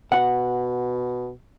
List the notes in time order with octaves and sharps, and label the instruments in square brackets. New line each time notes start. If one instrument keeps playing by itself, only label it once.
[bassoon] B2 [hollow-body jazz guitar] F#5